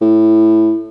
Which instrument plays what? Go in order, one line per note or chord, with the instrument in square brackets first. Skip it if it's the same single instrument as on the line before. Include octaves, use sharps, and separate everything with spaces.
[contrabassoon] A2